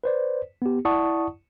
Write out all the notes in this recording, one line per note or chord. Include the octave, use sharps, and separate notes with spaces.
B4 C5 D5
B3 G4
E4 D5 F#5 A5 C#6 D#6